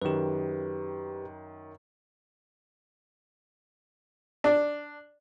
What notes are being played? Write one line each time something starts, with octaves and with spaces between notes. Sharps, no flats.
F#2 D#3 G4 B4
D4